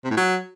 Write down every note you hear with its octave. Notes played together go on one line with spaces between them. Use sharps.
C3
A2
F#3